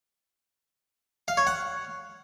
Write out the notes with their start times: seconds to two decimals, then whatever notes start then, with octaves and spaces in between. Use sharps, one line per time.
1.28 F5
1.37 C#5
1.47 F#5